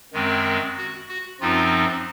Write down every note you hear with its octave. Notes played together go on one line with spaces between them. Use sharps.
F#2 D#3 G#3 C4
F#4
F#4
F#2 F3 C4 D#4 F4